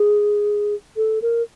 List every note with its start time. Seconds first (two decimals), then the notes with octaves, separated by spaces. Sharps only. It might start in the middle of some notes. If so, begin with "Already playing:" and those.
Already playing: G#4
0.96 A4
1.22 A#4